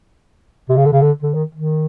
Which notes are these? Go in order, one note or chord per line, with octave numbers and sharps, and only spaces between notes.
C3
C#3
D3
C#3
D3
D3
D#3
D#3